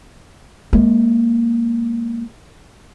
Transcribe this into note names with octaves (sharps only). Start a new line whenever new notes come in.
G#3 A#3